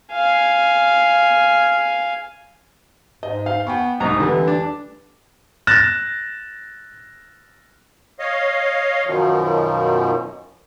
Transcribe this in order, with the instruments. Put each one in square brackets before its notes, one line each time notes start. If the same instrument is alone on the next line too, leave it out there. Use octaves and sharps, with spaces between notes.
[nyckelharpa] F5 G#5
[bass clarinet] G#2 [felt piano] D#5
[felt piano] F5
[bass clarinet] B3 [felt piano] G5 G#5 C#6
[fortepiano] C2 G#2 A#5 [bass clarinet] D#4
[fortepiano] D3 [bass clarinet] E3 [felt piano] G3 A3 B4
[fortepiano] D4
[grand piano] F#6 A6 A#6 E7
[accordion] C#5 D#5 F5
F#2 B2 D#3 F3